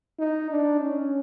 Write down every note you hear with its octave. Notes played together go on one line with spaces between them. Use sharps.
D#4
D4
C#4